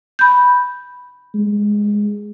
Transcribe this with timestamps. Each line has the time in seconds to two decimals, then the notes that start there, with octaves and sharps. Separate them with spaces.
0.19 B5 G6
1.35 G#3